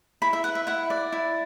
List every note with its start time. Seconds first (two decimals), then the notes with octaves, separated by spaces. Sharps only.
0.22 E4 B5
0.33 E5
0.44 B4 F#5
0.55 E5
0.67 E4 F#5
0.90 D5
1.12 E4